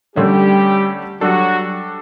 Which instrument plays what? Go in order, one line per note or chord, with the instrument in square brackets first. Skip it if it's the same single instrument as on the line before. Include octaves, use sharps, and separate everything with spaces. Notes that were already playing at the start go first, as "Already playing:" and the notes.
[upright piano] D3 A3 C#4 [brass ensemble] G3 G4
[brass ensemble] F#3 F#4 [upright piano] G3 D4 A4